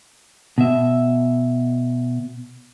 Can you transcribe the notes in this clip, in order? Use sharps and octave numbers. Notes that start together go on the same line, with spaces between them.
B2 E5